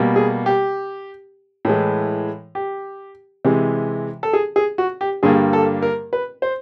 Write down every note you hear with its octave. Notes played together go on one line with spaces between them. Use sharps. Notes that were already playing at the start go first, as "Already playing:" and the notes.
Already playing: B2 G3 A#3
G#4
G4
A2 E3 G#3
G4
C3 E3 G#3
A4
G#4
G#4
F#4
G4
G2 D3 G3 A#3 G#4
A4
A#4
B4
C5